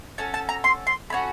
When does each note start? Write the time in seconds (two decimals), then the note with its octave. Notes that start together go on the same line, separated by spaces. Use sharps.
0.18 C#4 F#4 A4 A5
0.34 A5
0.49 A#5
0.64 C6
0.87 C6
1.10 A3 C#4 F#4 B5